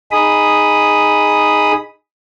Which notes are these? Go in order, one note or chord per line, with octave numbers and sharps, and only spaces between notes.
D#4 G#4 B5 D#6